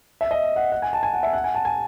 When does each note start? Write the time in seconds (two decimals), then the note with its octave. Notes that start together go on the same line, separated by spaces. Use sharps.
0.21 E5
0.31 D#5
0.56 F#5
0.72 F#5
0.82 G#5
0.93 A5
1.03 G#5
1.14 F#5
1.23 E5
1.33 F#5
1.44 G#5
1.55 A5
1.65 G#5